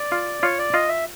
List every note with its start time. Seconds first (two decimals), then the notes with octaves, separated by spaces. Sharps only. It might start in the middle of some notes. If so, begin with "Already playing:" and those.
Already playing: D5
0.12 F4
0.42 F4 C#5
0.59 D5
0.73 F4 D#5
0.89 E5